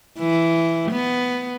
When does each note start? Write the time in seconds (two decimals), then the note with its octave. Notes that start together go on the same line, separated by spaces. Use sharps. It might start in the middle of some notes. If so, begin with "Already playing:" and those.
0.19 E3
0.91 B3